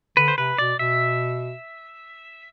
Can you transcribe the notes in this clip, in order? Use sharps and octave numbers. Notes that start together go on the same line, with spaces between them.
D3 B4
C5
C3 B4
B2 D5
B2 E5